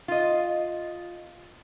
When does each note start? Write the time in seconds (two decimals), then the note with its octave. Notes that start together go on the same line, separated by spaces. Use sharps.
0.08 F4 D#5